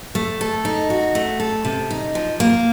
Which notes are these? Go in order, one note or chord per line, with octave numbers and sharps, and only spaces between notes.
A3
A4
D#4
F#4
A3
A4
C3
D#4
F3
A#3